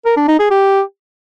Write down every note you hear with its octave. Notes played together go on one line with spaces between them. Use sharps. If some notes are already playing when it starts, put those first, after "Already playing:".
A#4
D4
D#4
G#4
G4